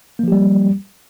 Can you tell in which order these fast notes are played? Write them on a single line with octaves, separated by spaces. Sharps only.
A#3 F3 G4 G3